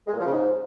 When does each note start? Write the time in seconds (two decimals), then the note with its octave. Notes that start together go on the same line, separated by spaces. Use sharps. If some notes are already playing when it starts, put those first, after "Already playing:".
0.07 G#3
0.13 A#2
0.20 F3
0.26 C#3
0.32 G#2